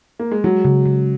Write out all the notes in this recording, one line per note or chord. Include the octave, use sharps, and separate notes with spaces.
A#3
G#3
F#3 G#3
C#3
C#3